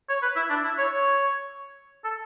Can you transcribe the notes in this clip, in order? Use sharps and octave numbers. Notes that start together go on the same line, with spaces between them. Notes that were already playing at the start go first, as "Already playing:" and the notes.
C#5
B4
E4
D4
E4
C#5
C#5
A4